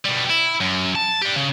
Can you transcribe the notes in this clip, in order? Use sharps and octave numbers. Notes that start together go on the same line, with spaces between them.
B2 G3
E4
F#2
A5
D4 G4
C#3